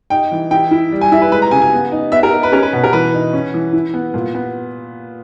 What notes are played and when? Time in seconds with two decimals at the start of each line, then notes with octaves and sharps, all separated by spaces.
0.10 D#4 G5
0.32 E3
0.51 E4 G5
0.71 E4
0.92 G3
1.01 G#5
1.12 E4 E5
1.22 B4
1.32 G#3 B4
1.42 A#5
1.51 C#3 G#5
1.62 G#5
1.73 B3
1.92 D#4
2.12 B3 E5
2.23 A#4
2.33 D#4
2.43 B4
2.52 C#4 A#4
2.63 B4
2.73 B2 B4
2.83 A#4
2.93 E3 B4
3.14 D#4
3.33 C#4
3.54 E3
3.73 E4
3.94 B3
4.14 A#2
4.35 B3